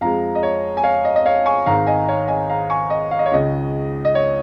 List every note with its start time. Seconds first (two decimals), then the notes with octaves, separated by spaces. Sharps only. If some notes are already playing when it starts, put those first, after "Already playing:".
0.01 F2 F3 G#3 F5 A#5
0.35 D#5
0.43 C#5
0.77 G#5
0.84 C#5 F5
1.05 D#5
1.16 D#5
1.26 C#5 F5
1.46 G#5 C#6
1.66 G#1 G#2 D#3 F5 A#5
1.87 D#5 G#5
2.08 C#5 F5
2.28 D#5 G#5
2.49 F5 A#5
2.70 G#5 C#6
2.90 D#5
3.11 F5
3.19 D#5
3.26 C#5
3.32 C#2 C#3 G#3 D#5
4.05 D#5
4.15 C#5